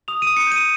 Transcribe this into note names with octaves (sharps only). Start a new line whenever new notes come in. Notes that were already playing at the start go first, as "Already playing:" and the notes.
D#6 F7
D#6 D#7
C#7
G6 D#7